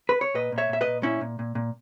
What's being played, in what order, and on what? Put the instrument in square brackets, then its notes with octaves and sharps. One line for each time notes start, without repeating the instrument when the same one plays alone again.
[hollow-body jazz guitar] B4
C#5
A#2 B4 D#5
A#2
C#5 E5
A#2 E5
B4 D#5
A#2
A#2 C#4 E4
A#2
A#2
A#2